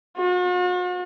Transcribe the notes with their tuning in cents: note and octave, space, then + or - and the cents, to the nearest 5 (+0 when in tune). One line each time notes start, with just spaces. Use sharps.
F#4 -45